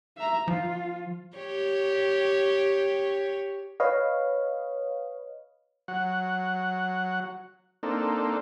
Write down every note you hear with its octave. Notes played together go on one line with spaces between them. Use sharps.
E5 A#5
F3 F4
G4 C#5
B4 C#5 D#5 F5
F#3 F#5
A#3 C4 D4 D#4 A4